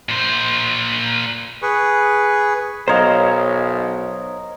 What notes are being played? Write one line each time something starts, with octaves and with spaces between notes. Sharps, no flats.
A#2 C5
G#4 B4 C#6
B1 A#4 C5 C#5 D#5 F5